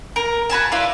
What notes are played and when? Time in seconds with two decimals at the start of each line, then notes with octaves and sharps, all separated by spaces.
0.16 A#4
0.50 F#4 B4 G#5 A5
0.72 E4 F4 B4 D5